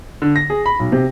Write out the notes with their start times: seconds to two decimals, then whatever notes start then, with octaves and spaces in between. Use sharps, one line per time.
0.22 D3
0.36 A#6
0.50 G#4
0.66 B5
0.79 B1
0.92 C3